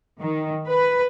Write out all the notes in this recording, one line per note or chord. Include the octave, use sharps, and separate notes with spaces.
D#3
B4